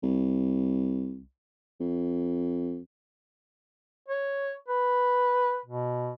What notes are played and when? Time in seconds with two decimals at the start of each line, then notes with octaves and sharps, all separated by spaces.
0.03 C2
1.80 F2
4.08 C#5
4.68 B4
5.66 B2